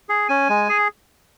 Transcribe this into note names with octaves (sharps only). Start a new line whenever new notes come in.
G#4
C#4 G#5
G#3
G#4